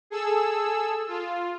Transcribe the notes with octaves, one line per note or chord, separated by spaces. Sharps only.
G#4 A4 E6
F4